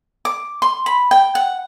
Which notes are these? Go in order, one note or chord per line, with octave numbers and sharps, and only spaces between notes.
D6
C6
B5
G5
F#5